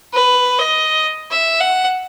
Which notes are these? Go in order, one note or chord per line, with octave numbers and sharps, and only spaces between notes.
B4
D#5
E5
F#5